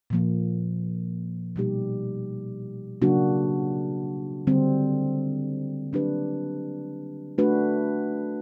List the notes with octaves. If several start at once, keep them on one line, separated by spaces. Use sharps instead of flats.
A#2 F3 A#3
B2 G3 A#3 D#4 G4
C#3 F#3 A#3 D4 F#4
D3 G3 C4
F#3 A#3 D4 G4 B4
A3 D4 F#4 B4